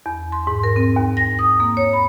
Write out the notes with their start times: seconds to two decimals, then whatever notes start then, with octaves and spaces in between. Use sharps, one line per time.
0.06 E2
0.32 C6
0.47 G#2
0.63 A#4
0.76 C4
0.96 D#2
1.17 A#6
1.39 D#6
1.60 A#3
1.77 C#5
1.93 B5